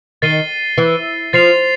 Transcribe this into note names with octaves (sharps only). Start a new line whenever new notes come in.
D#3 A6 C7 D#7 G7
E3
F3 A6 C7 F7